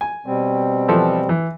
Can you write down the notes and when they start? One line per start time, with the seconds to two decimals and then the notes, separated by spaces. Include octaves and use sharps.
0.01 G#5
0.26 B2 G3 C4
0.88 E3 F3 A4
1.29 E3